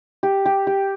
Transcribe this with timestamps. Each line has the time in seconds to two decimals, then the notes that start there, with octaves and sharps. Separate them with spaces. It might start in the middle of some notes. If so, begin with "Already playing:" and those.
0.23 G4
0.46 G4
0.67 G4